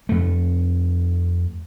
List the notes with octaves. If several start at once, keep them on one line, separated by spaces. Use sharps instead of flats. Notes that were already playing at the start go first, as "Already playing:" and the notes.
F2 A3